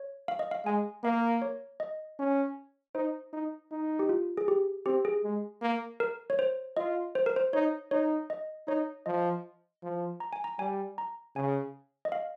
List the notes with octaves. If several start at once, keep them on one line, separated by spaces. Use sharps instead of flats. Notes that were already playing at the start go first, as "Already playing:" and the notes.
Already playing: C#5
F5
D#5
F5
G#3 G#5
A#3 F5
C#5
D#5
C#4
D#4 C5
D#4
D#4
G4
F4
G#4
G4
C4 G4
G#4
G#3
A#3
A#4
C#5
C5
F4 D#5
C5
A#4
C5
D#4 C#5
D#4 C#5
D#5
D#4 C#5
F3 D#5
F3
A#5
G#5
A#5
G3 G#5
A#5
C#3 G#5
D#5
F5